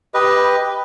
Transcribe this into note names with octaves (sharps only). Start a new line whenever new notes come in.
G4 B4 D#5